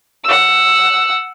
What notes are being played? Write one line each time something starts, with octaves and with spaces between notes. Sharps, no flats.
F#5 E6